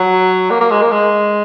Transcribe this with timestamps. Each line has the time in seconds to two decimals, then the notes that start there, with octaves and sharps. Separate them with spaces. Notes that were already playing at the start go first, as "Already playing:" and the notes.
Already playing: F#3
0.50 A#3
0.61 A#3
0.70 G#3
0.82 A#3
0.91 G#3